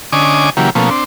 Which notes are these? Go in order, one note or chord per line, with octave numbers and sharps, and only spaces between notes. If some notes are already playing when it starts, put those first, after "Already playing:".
D3 C#4 D#5 G#5 D6
C#3 E3 F#3 A#3 G4
B2 F3 A3 A#3 C#4
C4 D4